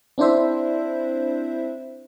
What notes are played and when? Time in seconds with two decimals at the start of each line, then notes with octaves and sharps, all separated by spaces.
0.18 C4 D4 E4 C5 E5